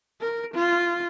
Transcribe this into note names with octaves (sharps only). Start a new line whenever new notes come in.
A#4
F4